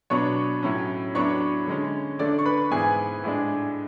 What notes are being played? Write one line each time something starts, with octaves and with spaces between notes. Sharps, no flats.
B2 F#3 B3 D4 C#5 C#6
A2 F#3 C#4
A2 F#3 B3 D4 C#5 C#6
D3 G#3 C#4
D3 A3 D4 D5 D6
C#6
B4 B5
G#2 E3 B3 G#4 G#5
A2 G#3 D4